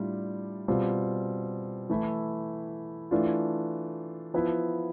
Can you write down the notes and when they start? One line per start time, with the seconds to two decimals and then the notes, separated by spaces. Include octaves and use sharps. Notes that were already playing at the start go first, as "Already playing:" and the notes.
Already playing: A2 G3 D4 F4
0.68 B2 G3 C4 F4
1.90 E3 A3 E4
3.11 E3 A3 D4 F4
4.34 F3 B3 E4